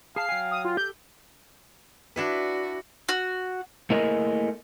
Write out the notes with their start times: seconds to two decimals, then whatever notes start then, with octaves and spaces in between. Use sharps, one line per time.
0.16 G#4 F5 A5 C7
0.29 F#3 G5 G#5
0.51 D#6
0.65 F4
0.77 G4 A4 G6
2.16 D4 E4 F#4 B4
3.09 F#4
3.90 A3 A#3 E4 G#4 A#4 D#5